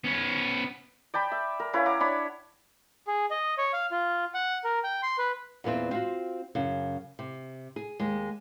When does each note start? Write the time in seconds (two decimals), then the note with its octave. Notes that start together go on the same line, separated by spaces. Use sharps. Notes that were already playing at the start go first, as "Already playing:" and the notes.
0.04 B3 C#4
1.14 D5 G5 A5 B5
1.32 E5
1.60 A#4
1.73 C#4 E4 B4 F5
1.86 F#5 A#5 D6
2.00 D4 C#5 B5
3.07 G#4
3.31 D#5
3.58 C#5
3.73 F5
3.91 F4
4.34 F#5
4.64 A#4
4.84 G5
5.03 C6
5.18 B4
5.64 E2 A#2 B3 C4 E5
5.91 C4 F4 F#4
6.55 F#2 C#3
7.19 C3
7.76 G#4
8.00 D#2 G#3